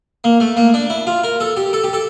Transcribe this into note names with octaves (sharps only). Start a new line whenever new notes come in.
A#3
A3
A#3
D4
E4
F4
A#4
A4
G4
A4
G4
A4